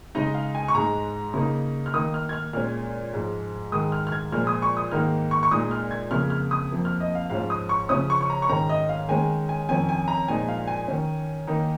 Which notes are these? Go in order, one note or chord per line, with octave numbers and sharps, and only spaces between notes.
C#3 G#3 D#4 D#5
F5
G#5
C#6
G#2 G#3 D#4 A#5
C#3 A#3 D#4
F6
D#3 A#3 D#4 D#6
F6
G#6
F6
A#2 G#3 C#4 F6
G#2 F3 G#3
G#2 D#3 G#3 D#6
F6
F6
G#6
A#2 F3 G#3 F6
D#6
C#6
D#6
G#2 D#3 A#3 D#4 F6
C#6
C#6
A#2 G#3 D#4 D#6
F6
G#6
F2 C#3 A#3 F6
F6
D#6
F2 F3 A#3
F6
D#5
F5
G#2 F3 C#4 F5
D#6
C#6
C#3 F3 C#4 D#6
C#6
C#6
A#5
C#6
G#2 D#3 C#4 A#5
D#5
F5
D#3 G#3 C#4 G#5
G#5
F2 D#3 C#4 G#5
G#5
A#5
A#2 F3 G#3 D#4 G#5
F5
G#5
D#3 C#4
D#3 A#3 D#4